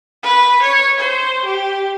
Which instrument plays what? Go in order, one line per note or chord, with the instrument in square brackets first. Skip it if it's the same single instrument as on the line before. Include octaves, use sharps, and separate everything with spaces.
[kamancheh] B4
C#5
C5
G4